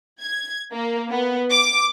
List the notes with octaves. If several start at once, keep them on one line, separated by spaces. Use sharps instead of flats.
G#6
A#3
B3
D6